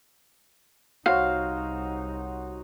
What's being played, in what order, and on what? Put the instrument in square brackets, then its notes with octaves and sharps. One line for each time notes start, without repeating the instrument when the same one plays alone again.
[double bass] C2 D#4 [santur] F#4 C5 C#5 [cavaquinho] F5